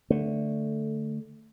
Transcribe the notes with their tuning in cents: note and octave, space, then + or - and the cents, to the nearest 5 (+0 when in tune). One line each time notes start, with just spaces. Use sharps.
D3 +0 A3 +0